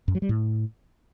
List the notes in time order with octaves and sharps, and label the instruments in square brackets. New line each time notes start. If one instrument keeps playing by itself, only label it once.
[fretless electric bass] F#2
F#3
G3
A2